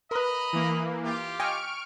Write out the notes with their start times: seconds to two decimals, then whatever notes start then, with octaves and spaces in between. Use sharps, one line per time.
0.11 A#4 B4 D#5 A#5 B5
0.53 E3 A#3
1.04 F4 G4
1.40 D#5 G5 G#5 C#6 F6 D7